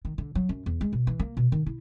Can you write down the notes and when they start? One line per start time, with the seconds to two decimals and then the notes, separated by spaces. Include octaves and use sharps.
0.05 D#3
0.18 D3
0.35 F#3
0.49 F#2
0.66 E2
0.81 G#3
0.93 B2
1.07 E3
1.20 A#3
1.37 B2
1.52 D#3
1.66 E4